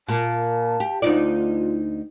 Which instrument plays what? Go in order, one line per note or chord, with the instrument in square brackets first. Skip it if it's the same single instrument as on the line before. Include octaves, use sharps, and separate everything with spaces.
[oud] A#2 [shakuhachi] A5
[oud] G4
[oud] D2 D#4 D5 [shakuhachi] F4